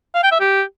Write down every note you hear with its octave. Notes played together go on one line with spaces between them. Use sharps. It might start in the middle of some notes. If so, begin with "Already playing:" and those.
F5
G5
E5
G4